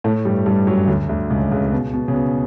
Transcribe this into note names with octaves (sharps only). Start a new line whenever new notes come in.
A2 A3
G2 G3
G2 G3
F#2 F#3
D2 D3
D2 D3
C#2 C#3
C#2 C#3
C#3
B2
B2
C#3
B2